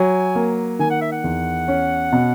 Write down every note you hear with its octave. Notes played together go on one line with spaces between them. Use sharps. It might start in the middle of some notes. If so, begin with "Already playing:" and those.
Already playing: F#3 G#5
A#3
D#3 G#5
F#5
E5
F#5
E2
C#4
B2